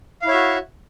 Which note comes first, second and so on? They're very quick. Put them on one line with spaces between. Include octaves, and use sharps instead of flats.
F5 E4 C#5 E5 F#4